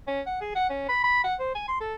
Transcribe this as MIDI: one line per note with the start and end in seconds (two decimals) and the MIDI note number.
0.08 0.21 61
0.26 0.36 78
0.41 0.52 68
0.55 0.69 78
0.70 0.87 61
0.89 0.99 83
1.04 1.19 83
1.24 1.34 78
1.40 1.52 72
1.55 1.64 80
1.68 1.80 84
1.81 1.95 69